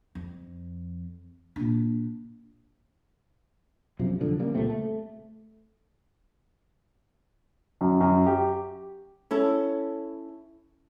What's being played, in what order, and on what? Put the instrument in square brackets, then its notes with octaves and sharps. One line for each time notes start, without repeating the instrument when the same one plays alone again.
[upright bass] F2
A#2 D4
[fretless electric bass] B1 F#2 C3 F3
D1 C2 D3 F3
C#3 G3 A#3
C#2 A#2 A3 C4
A3
[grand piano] F#2
F#2
G4
[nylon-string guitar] C#4 E4 A4